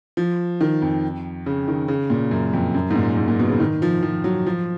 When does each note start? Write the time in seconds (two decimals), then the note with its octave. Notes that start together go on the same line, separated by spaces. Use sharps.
0.17 F3
0.61 D#3
0.82 F2
1.46 C#3
1.68 D#3
1.88 C#3
2.10 A#2
2.31 F#2
2.53 F2
2.74 F#2
2.91 G#2
2.96 A#2
3.17 G#2
3.28 A#2
3.39 B2
3.49 C#3
3.60 D#3
3.82 F3
4.03 F3
4.24 F#3
4.47 F3